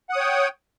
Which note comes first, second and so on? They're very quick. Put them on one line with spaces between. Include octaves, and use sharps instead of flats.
F#5 D#6 C#5 G5